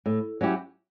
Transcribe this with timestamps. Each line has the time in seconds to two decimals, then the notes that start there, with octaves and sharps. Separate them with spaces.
0.06 A2
0.41 F#3 C#4 E4 G4